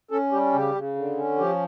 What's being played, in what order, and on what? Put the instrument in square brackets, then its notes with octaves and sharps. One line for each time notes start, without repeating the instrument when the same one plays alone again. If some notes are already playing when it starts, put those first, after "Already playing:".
[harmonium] C#4 A4
G3 G4
C#3 G4
C#3
D3
C#4
F3 G4